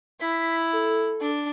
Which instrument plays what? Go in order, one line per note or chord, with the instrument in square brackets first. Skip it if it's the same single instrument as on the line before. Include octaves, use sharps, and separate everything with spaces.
[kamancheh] E4 [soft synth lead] B6
[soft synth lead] A4
[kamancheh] D4